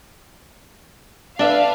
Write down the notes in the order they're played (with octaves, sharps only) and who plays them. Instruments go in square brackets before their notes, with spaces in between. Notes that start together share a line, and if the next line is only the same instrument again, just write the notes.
[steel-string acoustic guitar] D4 E5 [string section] B4 F5